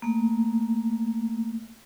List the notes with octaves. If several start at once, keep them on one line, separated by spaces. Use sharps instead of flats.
A3 A#3